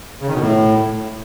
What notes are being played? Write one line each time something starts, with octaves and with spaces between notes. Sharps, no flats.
C#3
D#3
B2
A2